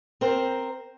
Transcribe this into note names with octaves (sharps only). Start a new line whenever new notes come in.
C4 A#4 C5